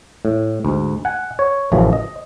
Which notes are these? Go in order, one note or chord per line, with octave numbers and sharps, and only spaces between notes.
A2
D2 G#2
F#5 G#5
C#5
A1 F#2 C#3 E3 F3
D#5